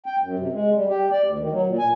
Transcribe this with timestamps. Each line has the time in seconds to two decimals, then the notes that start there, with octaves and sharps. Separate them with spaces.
0.06 G5
0.21 F#2
0.39 C3
0.52 G#3
0.74 G3
0.89 G4
1.12 D5
1.23 D2
1.39 D#3
1.52 F#3
1.66 A#2
1.79 G#5